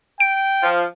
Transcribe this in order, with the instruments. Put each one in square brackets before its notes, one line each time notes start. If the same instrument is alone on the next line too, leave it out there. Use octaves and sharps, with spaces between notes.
[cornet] G5 [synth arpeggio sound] D7
[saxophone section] F3